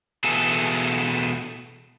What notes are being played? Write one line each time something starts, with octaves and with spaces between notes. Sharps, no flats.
B2 E3 A3 G#4 A4